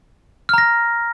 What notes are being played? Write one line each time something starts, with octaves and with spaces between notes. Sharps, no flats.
A#5 F6 A#6